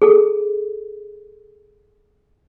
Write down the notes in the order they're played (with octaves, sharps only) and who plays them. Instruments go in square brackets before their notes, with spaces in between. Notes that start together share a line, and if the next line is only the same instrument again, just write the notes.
[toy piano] G#4 A4